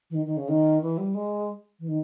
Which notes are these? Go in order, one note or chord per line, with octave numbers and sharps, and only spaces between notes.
E3
D#3
D#3
C#3
D#3
E3
G3
G#3
E3
D#3